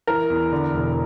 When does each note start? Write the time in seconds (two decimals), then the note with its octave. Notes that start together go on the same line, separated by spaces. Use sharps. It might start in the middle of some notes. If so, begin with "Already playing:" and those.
0.07 E3 A#4
0.30 E2
0.52 D3
0.74 E1